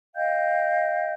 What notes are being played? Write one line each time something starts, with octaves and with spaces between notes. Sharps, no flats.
D#5 F5 G5 G6